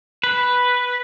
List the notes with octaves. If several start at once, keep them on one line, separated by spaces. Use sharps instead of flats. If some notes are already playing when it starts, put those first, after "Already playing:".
B4